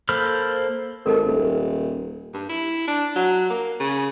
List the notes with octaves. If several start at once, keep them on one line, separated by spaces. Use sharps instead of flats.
A#3 A4 C5 B5 F6
G#1 D#4 A4 A#4
D#1
G2
E4
D4
F#3
A#3
C#3